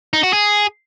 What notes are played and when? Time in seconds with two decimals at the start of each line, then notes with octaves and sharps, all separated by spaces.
0.13 D#4
0.23 F#4
0.33 G#4